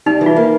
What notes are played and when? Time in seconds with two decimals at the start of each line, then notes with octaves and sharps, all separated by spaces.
0.06 G3 D#4
0.21 E3
0.26 F4
0.36 A#3